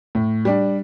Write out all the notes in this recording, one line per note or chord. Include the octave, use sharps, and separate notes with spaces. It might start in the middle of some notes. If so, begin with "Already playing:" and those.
A2
G3 D4